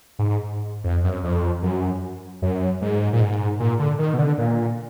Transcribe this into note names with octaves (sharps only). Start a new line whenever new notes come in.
G#2
F2
F#2
F2
F#2
F#2
G#2
A#2
G#2
A#2
D3
D#3
B2
D3
A#2